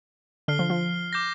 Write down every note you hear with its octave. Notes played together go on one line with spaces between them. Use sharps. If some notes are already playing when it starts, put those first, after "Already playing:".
D3 F6 C7 G7
F3
F3
D6 G6 A#6